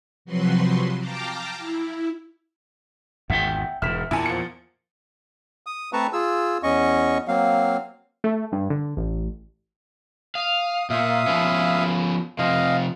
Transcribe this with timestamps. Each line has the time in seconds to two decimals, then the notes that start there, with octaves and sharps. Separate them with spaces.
0.25 C3 F3 F#3 F#4 B4 C6
0.98 F5 G5 A5 A#5 D6
1.58 E4
3.30 G#1 E2 E5 F#5 G5
3.82 E1 G#2 E5 F6 B6
4.11 E2 A#2 E4 G#5 A5
4.26 F3 C#7
5.66 D#6
5.93 A3 C4 B4 A5 A#5 C#6
6.13 F4 G#4 E6
6.63 E2 C#4 D#5 C#6
7.28 F#3 A#3 C4 F5
8.24 A3
8.52 G2
8.70 D3
8.97 A1
10.35 F5 D#6
10.90 A#2 E5 F5 D#6
11.27 F3 B3 C#4
12.39 C3 F3 D#5 F5